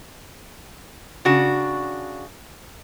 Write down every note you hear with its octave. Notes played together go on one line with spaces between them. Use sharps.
C#3 D4 F#4